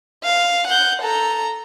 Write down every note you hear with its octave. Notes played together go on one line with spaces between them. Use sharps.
F5
F#5 G6
A4 A#5